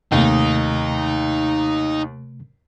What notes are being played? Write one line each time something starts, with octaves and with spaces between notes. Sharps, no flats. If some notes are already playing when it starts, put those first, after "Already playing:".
D#2 C3 A3 D#4